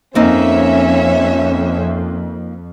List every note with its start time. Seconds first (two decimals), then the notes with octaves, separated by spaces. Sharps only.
0.15 F2 A#3 C4 C#4 D#4 E5